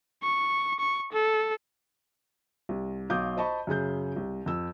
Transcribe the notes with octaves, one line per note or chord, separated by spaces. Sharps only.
C#6
C#6
A4
C2
B1 F5 D6 D#6 G6
C5 D#5 A5 B5 C#6
F#2 C#3 G#4 G6
C2
F2 E6